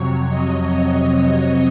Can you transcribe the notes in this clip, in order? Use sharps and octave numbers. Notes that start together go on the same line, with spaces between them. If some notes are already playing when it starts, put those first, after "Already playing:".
Already playing: F2 C3 F#3 C#5
D#5
C#5